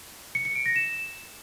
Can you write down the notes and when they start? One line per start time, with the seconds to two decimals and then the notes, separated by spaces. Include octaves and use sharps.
0.35 C#7
0.45 C#7
0.55 D7
0.66 A#6
0.76 E7